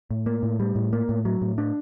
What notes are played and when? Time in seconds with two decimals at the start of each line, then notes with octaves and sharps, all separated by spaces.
0.11 A2
0.26 A#3
0.43 A2
0.60 G3
0.76 A2
0.93 A#3
1.09 A2
1.25 F#3
1.42 A2
1.58 D4